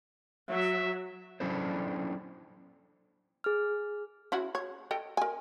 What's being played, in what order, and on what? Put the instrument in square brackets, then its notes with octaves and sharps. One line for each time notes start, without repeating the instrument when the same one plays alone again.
[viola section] F#3 [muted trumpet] E5
[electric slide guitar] F#3 C#4 D4 E4 A4 C5
[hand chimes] G#4 F6
[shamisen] C#4 E4 F#4
C#5
A4 D#5 G5
A#4 G#5